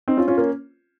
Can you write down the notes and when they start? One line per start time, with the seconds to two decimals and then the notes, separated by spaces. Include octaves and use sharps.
0.08 C4 D#4
0.17 C#4 F4
0.28 C#4 F4
0.38 A#3 C#4